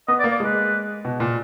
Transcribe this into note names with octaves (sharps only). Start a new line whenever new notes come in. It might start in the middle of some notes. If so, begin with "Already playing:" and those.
B3 D#5
D5
A#3
D5
G#3 B4
B2
A#2